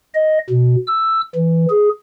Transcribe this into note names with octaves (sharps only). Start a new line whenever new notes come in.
D#5
B2
E6
E3
G#4